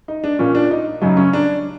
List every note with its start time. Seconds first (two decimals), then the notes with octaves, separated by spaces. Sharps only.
0.08 D#4
0.24 D4
0.39 A#2 F3 C#4
0.55 D4
0.71 D#4
1.01 F#2 C#3 F#3 D#4
1.17 C#4
1.33 D4